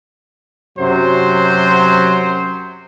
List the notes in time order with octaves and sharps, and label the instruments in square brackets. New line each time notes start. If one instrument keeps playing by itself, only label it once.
[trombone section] F#2 C3 F#3 [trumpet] C5